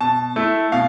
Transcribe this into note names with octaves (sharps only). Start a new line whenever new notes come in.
B2 A5
A3 E4
B2 F5